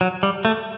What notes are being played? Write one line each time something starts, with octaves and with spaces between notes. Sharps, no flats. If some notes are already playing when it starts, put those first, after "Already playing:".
F#3
G3
A3